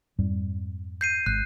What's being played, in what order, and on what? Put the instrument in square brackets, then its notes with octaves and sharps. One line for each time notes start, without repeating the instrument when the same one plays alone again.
[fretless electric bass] F2 G#2 G3
[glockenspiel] G6 C7 D#7
[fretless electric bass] G#1 [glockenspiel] F#6